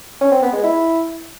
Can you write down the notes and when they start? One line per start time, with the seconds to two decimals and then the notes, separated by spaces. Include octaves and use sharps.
0.21 C#4
0.32 C4
0.42 B3
0.53 G#3
0.63 E4